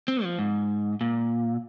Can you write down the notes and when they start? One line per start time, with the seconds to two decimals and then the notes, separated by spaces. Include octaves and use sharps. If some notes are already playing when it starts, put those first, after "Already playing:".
0.08 C4
0.24 F3
0.39 G#2
1.01 A#2